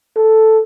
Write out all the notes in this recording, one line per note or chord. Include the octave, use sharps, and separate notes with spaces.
A4